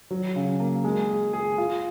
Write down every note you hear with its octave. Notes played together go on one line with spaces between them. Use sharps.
F#3
C#3
A#3
G#3
G#4
G#4
F4